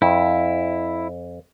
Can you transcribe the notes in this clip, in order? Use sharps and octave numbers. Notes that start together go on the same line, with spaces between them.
F2 E4